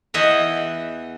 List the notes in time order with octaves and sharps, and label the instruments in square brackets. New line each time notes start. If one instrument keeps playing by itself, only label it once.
[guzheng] E2 E3 D#5 E5 F#5